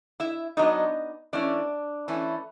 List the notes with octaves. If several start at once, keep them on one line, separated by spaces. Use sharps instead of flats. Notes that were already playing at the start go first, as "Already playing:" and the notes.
E4 E5
F#3 B3 D4 D#4 D#5
E3 A3 C#4 D4 E4 D5
E3 A3 C#4 E4